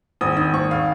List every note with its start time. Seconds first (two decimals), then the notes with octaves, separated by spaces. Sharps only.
0.21 G#1 D#6
0.37 D#3 D#6
0.54 G#1 C#6
0.71 F5